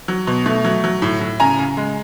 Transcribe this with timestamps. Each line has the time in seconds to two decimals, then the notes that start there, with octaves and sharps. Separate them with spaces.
0.08 F#3
0.27 B2
0.46 A3
0.65 F#3
0.84 F#3
1.02 A2
1.21 A2
1.40 C#3 G#5 A#5
1.59 C#3
1.77 G#3